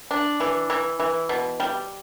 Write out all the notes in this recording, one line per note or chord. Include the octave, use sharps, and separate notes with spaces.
D4
E3
E3
E3
B2
G3